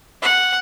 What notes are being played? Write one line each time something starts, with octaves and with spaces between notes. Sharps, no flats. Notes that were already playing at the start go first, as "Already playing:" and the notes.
F#5